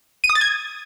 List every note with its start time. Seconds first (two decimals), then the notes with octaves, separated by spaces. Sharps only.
0.24 D#7
0.30 D#6
0.35 A6
0.41 G#6